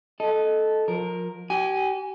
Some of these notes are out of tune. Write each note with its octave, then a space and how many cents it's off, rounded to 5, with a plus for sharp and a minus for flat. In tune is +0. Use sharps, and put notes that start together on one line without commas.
A4 -10 D#5 +0
F3 +30 A#4 +0
G4 -40 G#5 +0